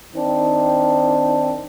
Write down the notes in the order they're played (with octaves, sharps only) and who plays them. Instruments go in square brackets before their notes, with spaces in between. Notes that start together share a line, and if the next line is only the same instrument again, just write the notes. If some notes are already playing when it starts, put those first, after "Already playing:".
[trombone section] D#3 C4 D4